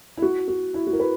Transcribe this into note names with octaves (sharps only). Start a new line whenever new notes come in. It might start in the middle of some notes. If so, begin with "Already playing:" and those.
E4
F#4
F#4
E4
F#4
A#4
B4